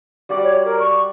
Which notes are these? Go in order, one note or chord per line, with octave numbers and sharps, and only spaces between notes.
G3 F#4 D5
C#5
A#4
C#6